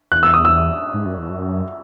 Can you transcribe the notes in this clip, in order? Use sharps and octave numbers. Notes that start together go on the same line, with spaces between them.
E2 F#6
E6
D#6
E6
G#2
F#2
E2
F#2